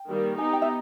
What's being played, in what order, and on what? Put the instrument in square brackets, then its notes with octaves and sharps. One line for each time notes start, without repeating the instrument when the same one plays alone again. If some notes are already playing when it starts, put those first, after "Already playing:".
Already playing: [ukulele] G5
[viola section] D#3 G3 A#3
[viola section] B3 D#4 G4 [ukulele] G#5
[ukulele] G5
E5